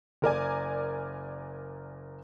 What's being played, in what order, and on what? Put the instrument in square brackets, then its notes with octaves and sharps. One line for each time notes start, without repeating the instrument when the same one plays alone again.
[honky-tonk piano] F#1 A#4 D5 G#5